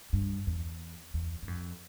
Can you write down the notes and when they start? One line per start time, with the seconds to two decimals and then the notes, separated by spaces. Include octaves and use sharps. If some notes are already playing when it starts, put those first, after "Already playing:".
0.13 G2
0.47 E2
1.14 E2
1.42 G2
1.48 F2